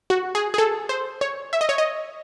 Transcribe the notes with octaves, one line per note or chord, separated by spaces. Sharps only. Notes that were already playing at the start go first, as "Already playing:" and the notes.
F#4
G#4
G#4
A4
C5
C#5
E5
D#5
C#5
D#5